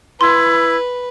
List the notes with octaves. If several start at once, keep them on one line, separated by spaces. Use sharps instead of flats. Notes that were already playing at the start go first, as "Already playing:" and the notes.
E4 B4 C6